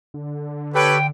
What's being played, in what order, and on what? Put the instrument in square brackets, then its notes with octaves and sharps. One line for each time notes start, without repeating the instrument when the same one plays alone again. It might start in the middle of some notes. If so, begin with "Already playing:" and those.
[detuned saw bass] D3
[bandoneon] G4 A4 [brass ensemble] B4 C#5 [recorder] G5